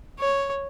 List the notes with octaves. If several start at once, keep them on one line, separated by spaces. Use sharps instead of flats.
C#5